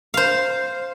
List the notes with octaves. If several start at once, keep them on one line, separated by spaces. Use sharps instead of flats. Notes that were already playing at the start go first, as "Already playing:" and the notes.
C5 F5